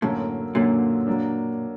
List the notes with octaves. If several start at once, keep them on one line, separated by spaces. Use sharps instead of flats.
F#2 A2 D3 F#3 A#3
F#2 A#2 D3 F#3 A#3
F#3 A#3 D4